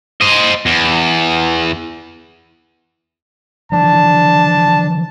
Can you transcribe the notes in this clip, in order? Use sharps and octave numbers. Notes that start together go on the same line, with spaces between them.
C5 D#5
E2
D3 E3 F3 D4 A5